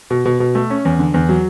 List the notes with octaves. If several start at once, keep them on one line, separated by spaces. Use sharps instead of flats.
B2
B2
B2
A3
C#4
E2
D3
E2
F#3